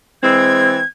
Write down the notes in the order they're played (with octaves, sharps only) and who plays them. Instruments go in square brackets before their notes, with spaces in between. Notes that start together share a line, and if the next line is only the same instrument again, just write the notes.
[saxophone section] E3 G#3 C4 [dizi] G#6